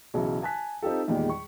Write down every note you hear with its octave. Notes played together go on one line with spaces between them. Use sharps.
B1 C#3 E3 F#3
G#5 A5 F#6 B6
C4 D#4 F4 G4 A4
E2 A#2 D#3 G3 G#3
C#6